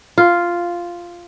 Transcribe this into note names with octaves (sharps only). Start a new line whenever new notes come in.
F4